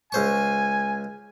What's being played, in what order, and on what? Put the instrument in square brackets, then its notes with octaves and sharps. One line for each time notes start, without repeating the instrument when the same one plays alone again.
[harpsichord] C#2 C5 C#6 [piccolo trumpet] G#5